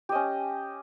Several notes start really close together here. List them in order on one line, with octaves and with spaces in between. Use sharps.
G4 D#5 C#4